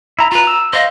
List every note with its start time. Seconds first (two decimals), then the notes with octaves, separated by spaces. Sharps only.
0.19 E4 A#5
0.32 F4 B4 A#5
0.47 E6
0.73 C5 D#5 F5